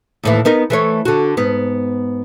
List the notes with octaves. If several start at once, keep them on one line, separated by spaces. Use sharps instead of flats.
D#2 A2 E3
B3 D#4 A#4
E3 A3 C#5
D3 F#4
G#2 B3